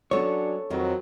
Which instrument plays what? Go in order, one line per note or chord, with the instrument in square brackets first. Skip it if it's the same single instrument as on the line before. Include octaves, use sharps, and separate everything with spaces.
[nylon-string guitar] F#3 B3 C#4 [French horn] D4 [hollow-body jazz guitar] A4 C#5
[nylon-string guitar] F2 D#3 C4 [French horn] F#3